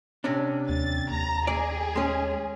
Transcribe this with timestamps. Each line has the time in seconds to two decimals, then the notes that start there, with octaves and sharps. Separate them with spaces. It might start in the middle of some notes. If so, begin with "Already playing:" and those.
0.24 C3 C#4 D4
0.69 D#2 A6
1.11 D#2 A#5
1.47 G#4 D5
1.95 G#3 C#4